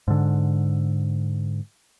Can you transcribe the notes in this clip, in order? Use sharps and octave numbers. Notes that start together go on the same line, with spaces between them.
G#2 D3